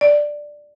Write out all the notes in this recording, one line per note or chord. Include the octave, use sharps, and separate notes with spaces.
D5